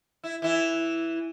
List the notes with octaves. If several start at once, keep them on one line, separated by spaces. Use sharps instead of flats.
E4
E3 E4